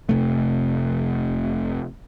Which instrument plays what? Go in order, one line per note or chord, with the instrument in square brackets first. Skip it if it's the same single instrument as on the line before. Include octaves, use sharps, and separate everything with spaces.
[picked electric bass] F1 C3 A3